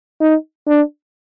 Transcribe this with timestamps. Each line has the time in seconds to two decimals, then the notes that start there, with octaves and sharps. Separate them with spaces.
0.21 D#4
0.67 D4